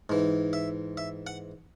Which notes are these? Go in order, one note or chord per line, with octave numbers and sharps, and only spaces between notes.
G#2 E3
E5
E5
F#5